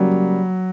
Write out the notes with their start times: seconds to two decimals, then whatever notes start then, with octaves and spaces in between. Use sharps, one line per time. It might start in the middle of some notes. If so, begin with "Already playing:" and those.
Already playing: C#3 F#3 G3 A#3